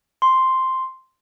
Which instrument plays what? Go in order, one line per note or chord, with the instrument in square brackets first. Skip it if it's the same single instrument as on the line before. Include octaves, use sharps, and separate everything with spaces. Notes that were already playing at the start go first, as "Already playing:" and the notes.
[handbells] C6